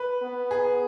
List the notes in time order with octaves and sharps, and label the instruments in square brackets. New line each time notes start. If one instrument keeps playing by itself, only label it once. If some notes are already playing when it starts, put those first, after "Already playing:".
Already playing: [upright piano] B4
[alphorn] B3
[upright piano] G#4